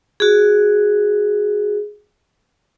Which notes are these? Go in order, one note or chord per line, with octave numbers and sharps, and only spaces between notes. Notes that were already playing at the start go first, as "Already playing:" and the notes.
F#4 G#4